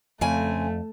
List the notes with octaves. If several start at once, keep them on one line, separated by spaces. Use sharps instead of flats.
F2 C#3 A3 C4 G#5